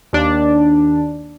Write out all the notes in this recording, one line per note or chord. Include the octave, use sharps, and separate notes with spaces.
D#2 D4